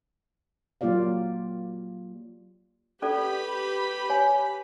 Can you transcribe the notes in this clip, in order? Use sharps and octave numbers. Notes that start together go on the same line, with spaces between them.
F#3 A#3 F4 G4 D5 F5
C#4 G4 A4 B4 D5 B5
C#5 G#5